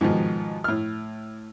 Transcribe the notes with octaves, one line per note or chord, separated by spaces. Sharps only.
G#2 B2 D#3 F3
A2 F6